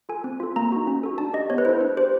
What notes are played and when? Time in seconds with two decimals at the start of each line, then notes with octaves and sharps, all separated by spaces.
0.09 F4 A4 G#5
0.24 C4
0.40 F4 A4
0.56 A#3 A#5
0.72 D#4 F#4
0.87 C#4
1.03 F#4 A4
1.18 D4 A5
1.34 G4 D#5
1.50 B3 C#5
1.58 B4
1.65 E4 A4 C5
1.81 D4 B4
1.97 G4 C5